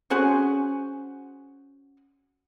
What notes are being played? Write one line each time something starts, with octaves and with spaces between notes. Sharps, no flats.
C#4 F#4 G#4 C5